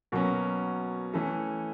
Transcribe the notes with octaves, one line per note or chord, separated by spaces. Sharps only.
B2 F#3 A#3 C#4 A#4
E3 A3 C#4 A4